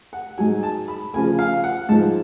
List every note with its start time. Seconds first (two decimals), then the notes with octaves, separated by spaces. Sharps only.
0.13 F#5
0.38 G#2 F#3 G#5
0.63 A5
0.88 B5
1.13 D2 C#3 F3 G#5
1.39 F5
1.64 F#5
1.89 G#2 F3 A5